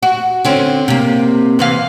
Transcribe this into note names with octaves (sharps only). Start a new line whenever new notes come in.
F#4
D3 C4 C#4
C3 A#3
C3 E3 F5